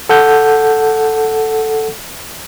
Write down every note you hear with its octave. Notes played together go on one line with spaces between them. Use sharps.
A4 F#5 G6